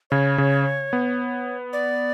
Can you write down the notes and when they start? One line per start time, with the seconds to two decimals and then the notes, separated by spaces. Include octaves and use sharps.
0.11 C#3 C#5
0.38 C#3
0.93 B3
1.73 D5